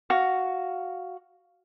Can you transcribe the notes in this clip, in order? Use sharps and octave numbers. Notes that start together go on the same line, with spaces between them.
F#4 F5